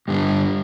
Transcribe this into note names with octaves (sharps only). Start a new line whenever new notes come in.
G2 D3 G3